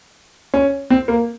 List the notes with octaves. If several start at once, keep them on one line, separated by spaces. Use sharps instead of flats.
C#4
C4
A#3